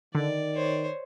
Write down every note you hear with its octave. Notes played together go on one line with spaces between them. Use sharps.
D3 D#3 D5
C5 C#5